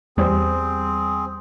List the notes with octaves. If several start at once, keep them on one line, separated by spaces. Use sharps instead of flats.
E2 G3 C4 G#4 C5